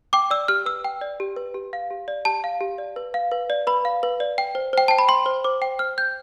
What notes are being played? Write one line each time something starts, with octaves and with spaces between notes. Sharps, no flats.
G5 D6
D5 E6
G4 F6
B4 E6
G5
D5
G4
B4
G4
F5
G4
D5
G4 A5
F5
G4
D5
B4
F5
B4
D5
B4 B5
F5
B4
D5
G5
C5
C5 G5
G5 A5
B5
G5 C6
C5
C5 D6
G5
C5 F6
G5 G6